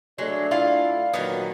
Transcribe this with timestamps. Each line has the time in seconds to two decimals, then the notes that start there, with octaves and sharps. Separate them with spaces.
0.18 F#3 G#3 A3 C#4 D4 D5
0.51 E4 F4 F5
1.14 A#2 D3 D#3 F#3 B3 D#4